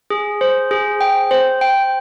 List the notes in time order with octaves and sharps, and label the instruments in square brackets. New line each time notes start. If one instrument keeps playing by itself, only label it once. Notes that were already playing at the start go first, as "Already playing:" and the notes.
[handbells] G#4
C5
G#4
G5
C5
G5